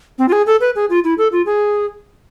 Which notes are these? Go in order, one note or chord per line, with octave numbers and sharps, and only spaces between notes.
C4
F4
G#4
A4
B4
G#4
F4
E4
A4
F4
G#4